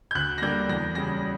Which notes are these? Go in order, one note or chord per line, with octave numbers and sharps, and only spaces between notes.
G6
D2 F#6
A#6
D3 G3 A#3 D4 G6
E2 A#6
C#3 G3 A#6